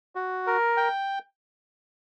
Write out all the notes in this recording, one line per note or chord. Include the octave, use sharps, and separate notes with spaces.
F#4
A#4
G5